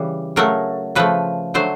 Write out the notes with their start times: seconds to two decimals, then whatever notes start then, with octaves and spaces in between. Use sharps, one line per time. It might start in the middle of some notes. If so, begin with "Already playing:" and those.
Already playing: C#3 E3 G3
0.36 C#3 F#3 A3 A#4
0.95 C#3 F3 A3 B4
1.54 D3 F#3 A3 C5